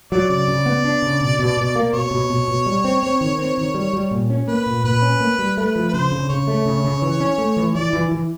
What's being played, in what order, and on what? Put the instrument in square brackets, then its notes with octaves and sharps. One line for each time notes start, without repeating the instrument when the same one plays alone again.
[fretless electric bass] F#3 [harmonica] D5
[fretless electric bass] C#3 [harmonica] D5
[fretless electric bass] C#3
B3
D4
C#3
B2
B2
B2
A#3
[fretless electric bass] B2 [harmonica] C#5
[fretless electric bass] B2
B2
B2
G3
C4
C4
D#3
C4
D#3
G3
G3
A#2
C#4
[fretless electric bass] A#3 [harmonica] B4
[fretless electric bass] A#2
[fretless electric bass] A#2 [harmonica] B4
[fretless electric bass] C#4
A#3
G3
[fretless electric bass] A3 [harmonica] B4
[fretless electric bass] F3
[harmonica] B4
[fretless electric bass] C#3 [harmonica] C5
[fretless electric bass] C#3
[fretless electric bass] C#3 [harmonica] C#5
[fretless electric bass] A3
C#3
C#3
E3
C#4
A3
E3
[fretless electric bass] E3 [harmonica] D5
[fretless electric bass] E3
E3